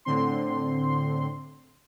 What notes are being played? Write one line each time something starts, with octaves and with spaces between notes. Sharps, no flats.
A2 D3 C4 C6